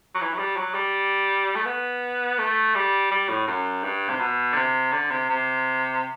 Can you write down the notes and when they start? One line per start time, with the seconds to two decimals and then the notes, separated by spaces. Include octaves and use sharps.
0.15 F#3
0.21 E3
0.34 F#3
0.38 G3
0.57 F#3
0.74 G3
1.55 A3
1.66 B3
2.39 A3
2.75 G3
3.11 G3
3.29 A2
3.47 F#2
3.84 G2
4.09 C3
4.20 B2
4.52 D3
4.56 C3
4.93 D3
5.11 C3
5.30 C3